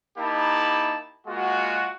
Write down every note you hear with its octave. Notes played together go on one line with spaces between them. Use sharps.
A#3 D#4 E4 G4 A5 B5
G#3 A#3 F4 F#4